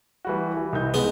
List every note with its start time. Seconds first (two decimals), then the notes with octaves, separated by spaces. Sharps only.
0.25 E3 G3 F#4
0.57 E3
0.73 C2 D#4 G6
0.94 G#3 B3